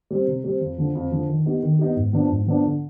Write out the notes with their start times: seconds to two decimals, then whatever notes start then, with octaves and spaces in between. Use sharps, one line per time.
0.11 G3 C4
0.27 C3
0.44 G3 C4
0.61 F2
0.78 D3 F3
0.95 F2
1.12 D3 F3
1.29 D#3
1.46 B3 D#4 G4
1.63 D#3
1.79 B3 D#4 G4
1.96 G#2
2.13 F3 B3 D4
2.29 G#2
2.46 F3 B3 D4
2.63 D3